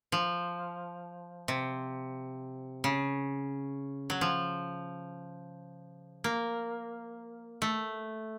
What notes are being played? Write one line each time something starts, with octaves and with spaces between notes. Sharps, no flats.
F3
C3
C#3
F#3
F3
A#3
A3